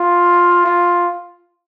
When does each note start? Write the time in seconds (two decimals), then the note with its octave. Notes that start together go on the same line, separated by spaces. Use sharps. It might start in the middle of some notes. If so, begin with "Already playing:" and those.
Already playing: F4
0.66 F4